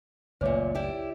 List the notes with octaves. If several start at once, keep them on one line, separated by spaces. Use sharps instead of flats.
F#1 C#2 F#2 A#2 A3 B4 C#5 D6
E4 G4 D5